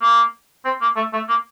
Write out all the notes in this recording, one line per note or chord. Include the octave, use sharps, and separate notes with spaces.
A#3
C4
A#3
A3
A3
A#3